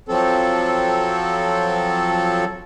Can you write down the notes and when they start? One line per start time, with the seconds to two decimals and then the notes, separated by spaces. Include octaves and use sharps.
0.09 F3 F#3 C4 A4